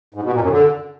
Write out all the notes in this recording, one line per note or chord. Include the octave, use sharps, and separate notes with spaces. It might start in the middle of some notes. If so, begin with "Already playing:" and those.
G#2
B2
A#2
F#2
D3